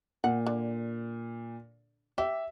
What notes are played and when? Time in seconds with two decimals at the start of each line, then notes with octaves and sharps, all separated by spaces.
0.24 A#2 F#5
0.47 D3
2.18 G4 E5